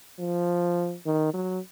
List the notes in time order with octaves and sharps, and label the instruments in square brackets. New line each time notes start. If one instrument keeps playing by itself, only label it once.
[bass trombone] F3
D#3
F#3